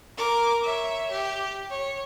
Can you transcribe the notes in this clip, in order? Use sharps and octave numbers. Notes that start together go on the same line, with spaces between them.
A#4 D6
C#5 E5
G4
C#5